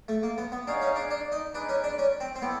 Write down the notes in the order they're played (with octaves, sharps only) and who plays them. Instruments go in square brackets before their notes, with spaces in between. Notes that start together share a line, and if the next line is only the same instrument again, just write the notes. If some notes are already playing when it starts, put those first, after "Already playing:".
[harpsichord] A3
A#3
B3
B3
[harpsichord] D4 [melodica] D#4 G#4 C#5 F5
[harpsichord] C#4
D4
D4
D#4
[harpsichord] D4 [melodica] D#4 G#4 B4
[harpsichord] C#4
D4
C#4
C4
C4
[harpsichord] B3 [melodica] E4 A4 D5